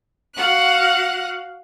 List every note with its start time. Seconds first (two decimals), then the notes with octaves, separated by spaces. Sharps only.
0.35 F#4 F5 F#5 F#6